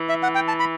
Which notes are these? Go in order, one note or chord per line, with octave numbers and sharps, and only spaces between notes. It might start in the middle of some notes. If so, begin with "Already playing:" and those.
Already playing: E3
E5
F#5
G5
A5
B5